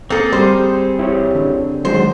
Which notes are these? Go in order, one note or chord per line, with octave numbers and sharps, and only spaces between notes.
A#3 C4 G#4 A4
G3 C5
E4 G4 C#5
D3
D#3 F#3 G#3 C5